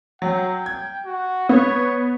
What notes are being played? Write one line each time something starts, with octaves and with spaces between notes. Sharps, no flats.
F#3 G5
G#6
F#4
B3 C#5